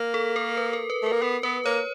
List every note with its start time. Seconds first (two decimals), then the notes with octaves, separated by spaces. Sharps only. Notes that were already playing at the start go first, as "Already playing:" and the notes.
Already playing: A#3
0.14 A4
0.36 A#4
0.57 B4
0.73 A#4
0.90 B4
1.02 A3 A#4
1.12 A#3
1.22 B3 A#4
1.43 B3 B4
1.65 A#3 C#5